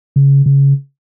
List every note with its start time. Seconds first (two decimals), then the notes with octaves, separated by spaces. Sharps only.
0.16 C#3
0.46 C#3